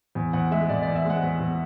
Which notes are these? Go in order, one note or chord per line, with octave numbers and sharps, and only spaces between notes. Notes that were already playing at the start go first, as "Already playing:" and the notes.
E2
E2 F#5
G#3 E5
E2 D5
D5
E2
E5
G#3 F#5
E2
E2